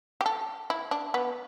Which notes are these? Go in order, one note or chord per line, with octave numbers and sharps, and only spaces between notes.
G4
A4
E4
D4
B3